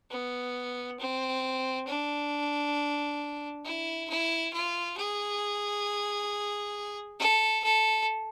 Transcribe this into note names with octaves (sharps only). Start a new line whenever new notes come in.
B3
C4
D4
E4
E4
F4
G#4
A4
A4